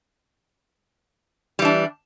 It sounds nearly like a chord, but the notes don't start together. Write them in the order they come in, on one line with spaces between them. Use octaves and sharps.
G3 E3 D4